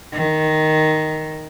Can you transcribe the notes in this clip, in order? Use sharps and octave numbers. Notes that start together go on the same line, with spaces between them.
D#3